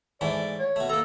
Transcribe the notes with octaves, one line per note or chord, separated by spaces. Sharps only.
G#2 E3 A3 D5
C#5
B2 A3
A#3 A4 A#5